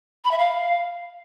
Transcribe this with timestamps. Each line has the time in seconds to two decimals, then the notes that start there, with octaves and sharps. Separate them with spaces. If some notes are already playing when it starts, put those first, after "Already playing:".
0.24 B5
0.31 E5
0.38 F5